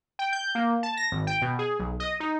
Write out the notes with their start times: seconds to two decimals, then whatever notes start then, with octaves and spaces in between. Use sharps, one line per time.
0.19 G5
0.33 G6
0.55 A#3
0.83 A5
0.97 A#6
1.12 G#1
1.27 G5
1.42 B2
1.59 G#4
1.79 B1
2.00 D#5
2.20 D#4